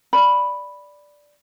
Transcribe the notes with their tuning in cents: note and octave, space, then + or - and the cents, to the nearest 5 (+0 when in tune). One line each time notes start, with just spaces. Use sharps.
D5 +0 B5 +0